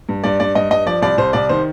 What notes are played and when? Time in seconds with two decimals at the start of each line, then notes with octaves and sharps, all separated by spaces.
0.09 G2
0.24 G2 D5
0.40 G2 D5
0.55 G2 D#5
0.71 G2 D#5
0.86 F3 D5
1.02 C2 D5
1.17 C2 C5
1.33 C2 D5
1.49 D#3 C5